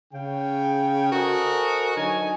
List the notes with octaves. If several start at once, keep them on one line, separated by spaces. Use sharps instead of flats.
C#3 G5
F#4 A4 A#4 C5 D#5 G#5
D3 F#3 D#4 G#5